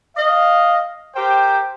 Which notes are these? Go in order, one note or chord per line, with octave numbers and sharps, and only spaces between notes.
D#5 F5
G4 A#4 C5 G5